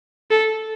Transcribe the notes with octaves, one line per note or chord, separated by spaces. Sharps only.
A4